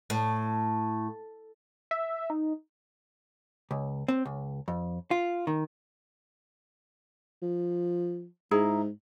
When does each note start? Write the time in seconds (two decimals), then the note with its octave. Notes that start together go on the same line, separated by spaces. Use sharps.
0.10 A2
1.91 E5
2.30 D#4
3.71 C#2
4.08 C4
4.25 C#2
4.68 F2
5.11 F4
5.47 D#3
7.42 F3
8.51 G#2 E4 G#4 A#5